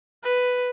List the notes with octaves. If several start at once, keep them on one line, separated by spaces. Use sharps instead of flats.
B4